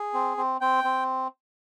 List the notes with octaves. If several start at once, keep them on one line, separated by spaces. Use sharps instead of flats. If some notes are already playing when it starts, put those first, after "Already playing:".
Already playing: G#4
C4
C4
C4 G5
C4